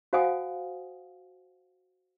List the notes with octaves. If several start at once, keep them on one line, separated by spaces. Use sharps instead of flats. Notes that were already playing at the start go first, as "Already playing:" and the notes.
F#4 C5 F5 F#5 G#5 D#6